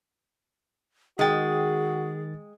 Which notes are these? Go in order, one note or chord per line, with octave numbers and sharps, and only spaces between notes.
D#3 G#3 F#4 G#4 G5 A6